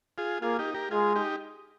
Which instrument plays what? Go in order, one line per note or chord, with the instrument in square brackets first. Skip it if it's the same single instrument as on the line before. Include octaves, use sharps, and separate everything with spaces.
[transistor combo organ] F4 G#4
[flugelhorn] A#3 [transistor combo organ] F4 G#4
[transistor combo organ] D#4 G4
G4 A#4
[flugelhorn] G#3 [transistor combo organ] F4 G#4
[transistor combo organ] D#4 G4